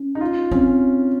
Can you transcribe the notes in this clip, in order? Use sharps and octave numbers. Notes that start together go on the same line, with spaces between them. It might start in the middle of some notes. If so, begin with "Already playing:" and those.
Already playing: C#4
D#4
F4
C4 C#4